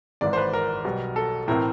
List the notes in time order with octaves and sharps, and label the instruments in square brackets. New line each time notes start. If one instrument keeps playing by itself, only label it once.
[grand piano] G#1 G#2 E3 D5
C5
B4
A#4
B1 B2 G3
A4
A2 E3 A3 C4 E4 A#4